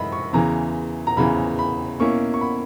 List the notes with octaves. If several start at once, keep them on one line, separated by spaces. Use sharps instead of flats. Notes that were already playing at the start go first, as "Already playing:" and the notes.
Already playing: F#2 E3 G#3 D#4 D#5 E5 B5
C#6
E2 C#3 E3 A#5
A#5
E2 C#3 E3 B5
B5
B2 A#3 C#4 E4 C#6
C#6
B5